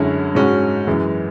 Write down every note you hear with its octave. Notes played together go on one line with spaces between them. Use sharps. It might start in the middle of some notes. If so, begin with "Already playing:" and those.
Already playing: F#2 D3 G#3 C#4 E4
G#2 G#3 C#4 F#4
F#2 E3 G#3